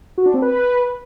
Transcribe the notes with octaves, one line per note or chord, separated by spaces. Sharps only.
F#4
D4
C4
B4